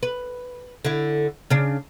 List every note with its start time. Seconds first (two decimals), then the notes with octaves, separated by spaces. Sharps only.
0.03 B4
0.85 D3 E4
1.50 C#3 D4